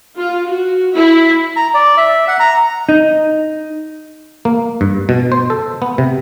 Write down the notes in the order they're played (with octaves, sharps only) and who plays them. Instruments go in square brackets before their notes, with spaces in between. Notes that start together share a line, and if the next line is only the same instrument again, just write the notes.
[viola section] F4
F#4
E4
[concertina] A#5
D5
E5
F#5
A#5
[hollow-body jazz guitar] D#4
[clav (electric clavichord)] A#3
G2
B2
C5
A4
B3
C3